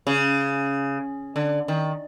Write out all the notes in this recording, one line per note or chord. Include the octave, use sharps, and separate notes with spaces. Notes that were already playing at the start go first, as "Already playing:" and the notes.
C#3
D3
D#3